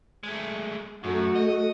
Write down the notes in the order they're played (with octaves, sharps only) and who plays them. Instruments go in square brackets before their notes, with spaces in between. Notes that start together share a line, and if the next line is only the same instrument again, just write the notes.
[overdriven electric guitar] G#3 A3
[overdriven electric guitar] F#2 [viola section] A3 F#4
[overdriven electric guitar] D#5